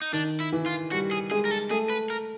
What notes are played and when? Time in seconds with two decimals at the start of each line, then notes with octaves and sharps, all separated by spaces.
0.02 D#4
0.13 D#3 D4
0.40 E4
0.52 E3
0.66 F4
0.92 G3 F#4
1.11 G#4
1.31 G#3 G#4
1.45 A#4
1.51 A4
1.71 A3 G#4
1.90 B4
2.10 A#4